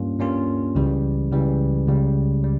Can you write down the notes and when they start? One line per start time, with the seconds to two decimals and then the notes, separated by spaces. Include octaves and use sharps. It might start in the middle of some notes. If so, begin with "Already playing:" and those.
Already playing: G2 G3 A#3 C#4 F4
0.20 G2 G3 A#3 C#4 F4
0.75 C#2 C#3 E3 G3
1.32 C#2 C#3 E3 G3
1.88 C#2 C#3 G3
2.44 G3